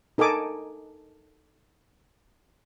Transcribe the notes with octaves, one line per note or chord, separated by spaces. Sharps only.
D#4 A4 A#4 G#5 D6 D#6